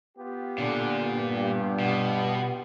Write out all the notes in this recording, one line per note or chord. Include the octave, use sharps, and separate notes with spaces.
B3 F4 G4
A#2 D3
G2
B2